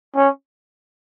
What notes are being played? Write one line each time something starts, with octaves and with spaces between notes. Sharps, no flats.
C#4